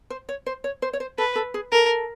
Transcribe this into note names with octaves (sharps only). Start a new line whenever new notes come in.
C5
C#5
C5
C#5
C5
C#5
C5
A4 B4
A4
G#4
A4 A#4